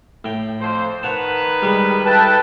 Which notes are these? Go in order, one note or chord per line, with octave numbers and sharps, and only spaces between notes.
A2 G5
F2 C5
D#3 A#4 B4 C#5 F#5 A5
G3 G#3
E4 A4 B4 G5 A5